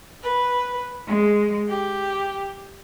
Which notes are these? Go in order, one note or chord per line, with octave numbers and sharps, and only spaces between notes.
B4
G#3
G4